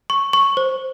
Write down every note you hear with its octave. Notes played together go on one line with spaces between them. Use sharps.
C#6
C#6
C5